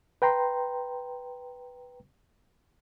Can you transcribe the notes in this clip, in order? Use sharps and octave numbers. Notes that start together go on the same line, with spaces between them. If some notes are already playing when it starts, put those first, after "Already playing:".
B4 G5 A#5 C6